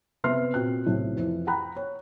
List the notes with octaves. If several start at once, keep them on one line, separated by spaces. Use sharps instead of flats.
C3 B3 E5 C6 F6 C7
A#2 C4 F#4 F#6
B1 A2 C3
F2 E3
F#5 G5 A#5 B5 F#6
C#5